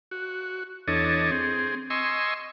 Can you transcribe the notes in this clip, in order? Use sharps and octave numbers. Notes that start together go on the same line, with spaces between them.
F#4
E2 D4 A4 C#5 D#5
C4 G#4
D#5 G#5 C6 C#6 E6